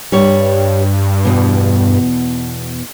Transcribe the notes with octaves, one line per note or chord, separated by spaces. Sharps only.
G2 G3 C#5
E2 B2